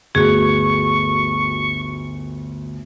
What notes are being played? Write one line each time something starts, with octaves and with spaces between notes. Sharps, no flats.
G1 D2 F#4 G#4 C#6